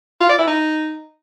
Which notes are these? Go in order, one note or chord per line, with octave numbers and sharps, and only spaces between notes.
F4
D5
E4
D#4